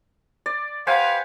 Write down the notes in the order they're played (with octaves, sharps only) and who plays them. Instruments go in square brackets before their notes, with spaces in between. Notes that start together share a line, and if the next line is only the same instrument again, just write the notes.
[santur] D5
[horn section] G4 B4 F5 [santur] C5 F#5 G#5